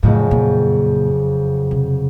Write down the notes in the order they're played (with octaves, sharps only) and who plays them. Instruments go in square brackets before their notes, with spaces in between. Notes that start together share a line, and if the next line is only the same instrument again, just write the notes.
[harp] F#1 F2 C#3 [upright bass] A2
[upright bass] A#2
C3